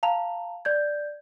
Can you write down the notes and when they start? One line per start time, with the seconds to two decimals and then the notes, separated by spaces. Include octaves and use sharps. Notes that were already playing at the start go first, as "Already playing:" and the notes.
0.03 F5 A5 A#5 F7
0.65 D5 G6 G#6